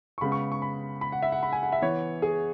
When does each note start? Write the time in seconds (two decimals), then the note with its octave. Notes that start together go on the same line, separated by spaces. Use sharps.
0.18 C#6
0.21 C#3 G#3 B3 B5
0.32 C#6
0.52 C#6
0.62 B5
1.01 B5
1.12 F#5
1.22 E5
1.32 F#5
1.43 B5
1.52 G#5
1.63 F#5
1.72 E5
1.82 E3 B3 C#5
2.22 G#4